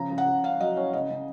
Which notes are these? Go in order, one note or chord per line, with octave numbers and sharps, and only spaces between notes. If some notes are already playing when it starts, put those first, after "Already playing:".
Already playing: C#3 F3 A#5
C#3
F#5
C#3
C#4 F5
F#3 D#5
C#4 C#5
C#3 D#5
C#3